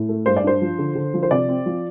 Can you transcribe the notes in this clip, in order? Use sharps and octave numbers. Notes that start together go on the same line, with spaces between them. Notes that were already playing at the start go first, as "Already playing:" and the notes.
Already playing: A2
A3
G2 C5
D5
D4 C5
F3
D3
D3
F3
C5
C3 D5
C4
F3